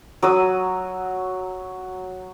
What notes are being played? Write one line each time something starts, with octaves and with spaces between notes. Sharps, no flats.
F#3 D#6 E6